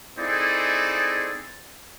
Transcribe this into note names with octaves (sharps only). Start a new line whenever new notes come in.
C4 D#4 E4 G#4 A4 D5